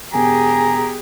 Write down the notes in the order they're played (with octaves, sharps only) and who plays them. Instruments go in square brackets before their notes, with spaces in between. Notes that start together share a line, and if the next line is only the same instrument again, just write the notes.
[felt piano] E1 [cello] G4 G#4 [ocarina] G#5 [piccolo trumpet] A#5